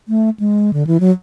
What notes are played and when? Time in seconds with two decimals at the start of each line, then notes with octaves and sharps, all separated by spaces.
0.08 A3
0.40 G#3
0.73 D3
0.87 E3
1.00 F#3